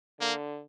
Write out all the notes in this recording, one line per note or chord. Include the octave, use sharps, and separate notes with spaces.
D3 A#3